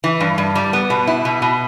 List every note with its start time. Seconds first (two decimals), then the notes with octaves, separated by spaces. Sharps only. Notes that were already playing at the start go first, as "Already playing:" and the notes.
0.04 E3
0.20 G2
0.38 G2
0.55 G3
0.73 B3
0.90 B2
1.07 E4
1.25 B2
1.42 B2